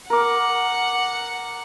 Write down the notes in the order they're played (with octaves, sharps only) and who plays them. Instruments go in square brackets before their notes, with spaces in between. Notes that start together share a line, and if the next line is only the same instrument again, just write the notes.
[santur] A#4 D6 [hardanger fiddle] F#5